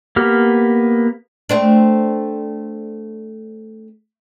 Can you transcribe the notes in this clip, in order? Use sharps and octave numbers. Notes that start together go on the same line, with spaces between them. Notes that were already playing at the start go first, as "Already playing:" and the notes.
A#3 B3 G4 F6
A3 C4 D4